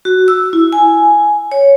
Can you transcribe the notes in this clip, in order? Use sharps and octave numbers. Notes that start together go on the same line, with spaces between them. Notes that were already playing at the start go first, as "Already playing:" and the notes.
F#4
E6
E4
G#5
C#5